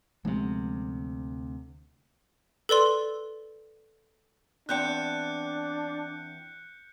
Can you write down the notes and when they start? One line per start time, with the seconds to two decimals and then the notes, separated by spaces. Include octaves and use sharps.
0.25 D2 C3 F3 G#3 B3
2.69 A4 B4 D5 C6
4.69 E2 C4 D4 G5 F#6 G6 C#7